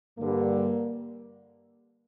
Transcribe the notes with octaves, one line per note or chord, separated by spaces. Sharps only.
G2 D3 G3 A#3